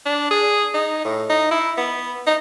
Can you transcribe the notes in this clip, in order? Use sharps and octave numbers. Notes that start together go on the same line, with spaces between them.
D4
G#4
D#4
A2
D#4
E4
B3
D#4